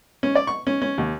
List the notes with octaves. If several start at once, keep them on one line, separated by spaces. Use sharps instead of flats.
C#4
D5
C#6
C#4
C#4
D#2